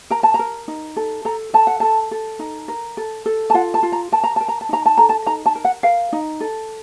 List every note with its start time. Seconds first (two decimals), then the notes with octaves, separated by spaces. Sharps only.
0.10 A#4 A#5
0.23 A5
0.34 A#5
0.39 A#4
0.68 D#4
0.96 A4
1.25 A4 A#5
1.53 A4 A5
1.67 F#5
1.80 A4 A5
2.11 A4
2.39 D#4
2.68 A#4
2.97 A4
3.26 A4
3.50 A5
3.54 F4 F#5
3.74 A5
3.83 F4
3.92 A#5
4.12 A#4 A5
4.24 A#5
4.36 A#4 A5
4.48 A#5
4.61 A5
4.69 D#4 A#5
4.86 A5
4.97 A4 A#5
5.09 A5
5.26 D#4 A#5
5.46 A5
5.55 A#4
5.65 F#5
5.83 A#4 F5
6.13 D#4
6.40 A4